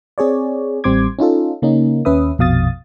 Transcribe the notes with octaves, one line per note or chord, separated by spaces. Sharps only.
C4 G#4 C#5 D5
A1 G3 C4 C6 D6 G#6
C#4 D#4 F4 A4
C#3 A#3 C#4 D#4
D#2 C#4 B4 E5 D#6
A#1 F2 B2 F5 D#6 A6